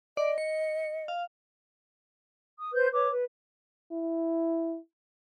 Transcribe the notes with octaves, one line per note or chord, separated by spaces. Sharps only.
D5 D#5
C#7
F5
D#6
B4 C5 G6
B4 C#5 D6
B4
E4